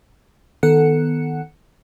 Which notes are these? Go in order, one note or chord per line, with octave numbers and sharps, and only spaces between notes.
D#3 B3 A4 F#5 F#6 C#7